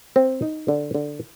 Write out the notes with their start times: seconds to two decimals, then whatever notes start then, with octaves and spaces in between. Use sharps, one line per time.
0.16 C4
0.42 D#4
0.68 D3
0.95 D3